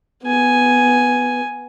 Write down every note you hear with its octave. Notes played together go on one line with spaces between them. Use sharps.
B3 G#5